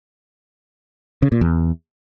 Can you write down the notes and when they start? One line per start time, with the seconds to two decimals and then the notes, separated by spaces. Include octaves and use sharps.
1.22 C#3
1.32 A#2
1.41 E2